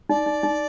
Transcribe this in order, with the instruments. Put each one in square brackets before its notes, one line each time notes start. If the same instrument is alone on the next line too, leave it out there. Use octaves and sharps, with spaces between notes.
[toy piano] D#4 [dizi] D5
[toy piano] D#4
D#4